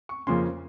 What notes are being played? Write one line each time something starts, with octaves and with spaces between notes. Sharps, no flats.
C#6
F2 C#3 F3 A#3 C#4 C6